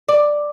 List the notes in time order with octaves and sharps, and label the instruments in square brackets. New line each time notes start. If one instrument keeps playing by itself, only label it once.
[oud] D5